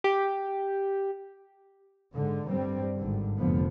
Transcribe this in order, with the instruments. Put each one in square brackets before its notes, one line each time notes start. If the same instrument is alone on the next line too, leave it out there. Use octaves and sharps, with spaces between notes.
[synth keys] G4
[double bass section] G#2 D3
G2 G3 C4
G#1 D3
F1 D3 F3 B3